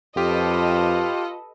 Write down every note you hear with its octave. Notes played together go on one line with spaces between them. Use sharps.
F2 F4 G4 A4 B4 D#5